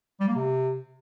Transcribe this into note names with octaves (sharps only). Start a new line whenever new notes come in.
G3
A#3
C3